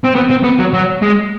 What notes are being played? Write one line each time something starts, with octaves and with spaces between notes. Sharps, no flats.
C4
B3
C4
B3
F#3
F#3
G#3